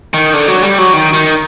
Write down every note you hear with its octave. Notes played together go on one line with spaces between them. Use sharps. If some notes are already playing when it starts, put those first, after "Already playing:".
D#3
D3
F#3
G3
F#3
D#3
D#3